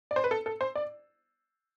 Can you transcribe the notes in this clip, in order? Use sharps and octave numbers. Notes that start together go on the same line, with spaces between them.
D5
C5
B4
A4
A4
C5
D5